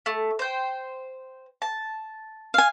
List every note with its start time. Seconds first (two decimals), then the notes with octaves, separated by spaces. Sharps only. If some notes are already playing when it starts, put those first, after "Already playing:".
0.06 A3
0.39 C5 G5
1.62 A5
2.54 F5 G#5